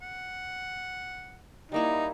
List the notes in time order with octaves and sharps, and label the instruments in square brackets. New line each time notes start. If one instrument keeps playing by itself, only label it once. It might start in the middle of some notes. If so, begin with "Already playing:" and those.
[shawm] F#5
[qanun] G3 A#3 E4 [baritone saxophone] D#4